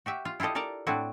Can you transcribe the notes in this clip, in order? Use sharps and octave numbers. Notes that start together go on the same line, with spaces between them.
F#4 G4 E5
F4 F5
E4 F4 G4 A4 D#5
A4 A#4 D5 A5 A#5
A2 C4 D4 E4 F#4